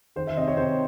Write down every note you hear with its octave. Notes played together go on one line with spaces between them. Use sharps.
D#3 C5
E5
C3 D#5
C#5
C3 C5